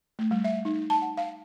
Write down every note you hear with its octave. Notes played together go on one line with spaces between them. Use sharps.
A3
G3
E5
D#4
A5
F#5
F5